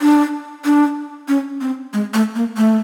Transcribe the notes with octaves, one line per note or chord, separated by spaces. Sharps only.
D4
D4
C#4
C4
G#3
A3
A#3
A3